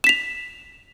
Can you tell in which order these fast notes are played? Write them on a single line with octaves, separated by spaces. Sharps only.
E7 B6 F7